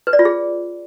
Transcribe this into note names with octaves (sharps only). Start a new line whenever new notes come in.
B4
D5
F4
G#4